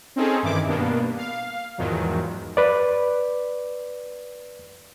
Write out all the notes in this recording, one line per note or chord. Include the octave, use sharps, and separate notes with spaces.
C4 C#4 D#4 G#4 A4
G2 D#3 E3 E4 D6
G2 B2 A#3 B3 D4
F5
E2 G#2 D#3 F3 F#3
B4 D5